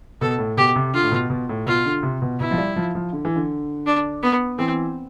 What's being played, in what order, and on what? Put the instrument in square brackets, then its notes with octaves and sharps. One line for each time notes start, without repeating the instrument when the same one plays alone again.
[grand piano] B2 [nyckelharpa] A4
[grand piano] A2
[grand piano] B2 [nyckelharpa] G4
[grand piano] C3
[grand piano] D3 [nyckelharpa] F4
[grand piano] A2
B2
B2
A2
[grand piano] B2 [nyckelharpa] F4
[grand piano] D3
C3
B2
[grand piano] B2 [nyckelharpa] E4
[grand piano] F3
G3
F3
F3
D3
E3
D3
[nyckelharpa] D4
B3
[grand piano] E3 [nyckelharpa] C4